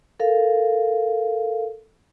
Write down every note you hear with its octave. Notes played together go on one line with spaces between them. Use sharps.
A4 A#4 F5